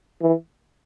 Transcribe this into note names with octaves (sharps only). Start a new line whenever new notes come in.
E3